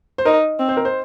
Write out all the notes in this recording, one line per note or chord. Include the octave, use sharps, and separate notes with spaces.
C5
D#4 A#4
C4
C5
A#4
C5